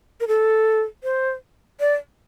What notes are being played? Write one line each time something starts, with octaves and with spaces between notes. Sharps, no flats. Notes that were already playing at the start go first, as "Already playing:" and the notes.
A#4
A4
C5
D5